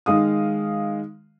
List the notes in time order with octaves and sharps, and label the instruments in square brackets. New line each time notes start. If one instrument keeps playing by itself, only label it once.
[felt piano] D#3 G#3 F5 D#6